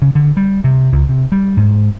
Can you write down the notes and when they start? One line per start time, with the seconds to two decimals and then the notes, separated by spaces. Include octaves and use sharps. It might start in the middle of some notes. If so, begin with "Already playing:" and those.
0.02 C#3
0.15 D3
0.37 G3
0.64 C3
0.92 C#2
1.09 C3
1.32 G3
1.57 G#2